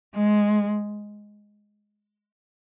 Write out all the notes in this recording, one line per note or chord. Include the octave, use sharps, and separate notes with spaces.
G#3